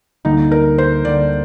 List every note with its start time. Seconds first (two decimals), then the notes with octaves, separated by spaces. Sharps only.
0.25 D2 D3 G3 A#3 D#4
0.52 A#4
0.78 C5
1.05 D2 D3 G3 A#3 D5